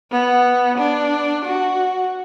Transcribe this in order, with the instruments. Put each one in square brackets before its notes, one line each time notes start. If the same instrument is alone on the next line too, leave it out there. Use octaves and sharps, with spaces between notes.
[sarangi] B3
D4
F#4